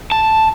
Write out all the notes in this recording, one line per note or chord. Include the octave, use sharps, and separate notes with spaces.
A5